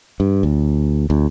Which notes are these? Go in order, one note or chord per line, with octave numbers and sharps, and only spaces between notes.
G2
D2
D2